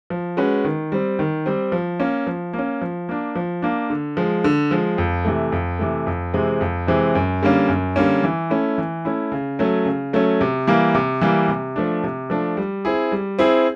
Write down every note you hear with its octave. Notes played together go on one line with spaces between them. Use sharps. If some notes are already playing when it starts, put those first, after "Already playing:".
F3
G#3 C#4 F#4 B4
D#3
G3 C4
D#3
G3 C4
F3
A#3 C#4
F3
A#3 C#4
F3
A#3 D4
F3
A#3 D4
D3
F3 G#3
D3
F3 G#3
F2
C3 E3 A3
F2
C3 E3 A3
F2
C3 E3 G#3 C4
F2
C3 E3 G#3 C4
F#2
D3 G3 A#3 C#4
F#2
D3 G3 A#3 C#4
E3
A3 C#4 E4
E3
A3 C#4 E4
C#3
F#3 A3 C#4
C#3
F#3 A3 C#4
C3
E3 G3 A#3
C3
E3 G3 A#3
C3
F3 A3 D4
C3
F3 A3 D4
G3
C4 E4 G#4
G3
C4 E4 G#4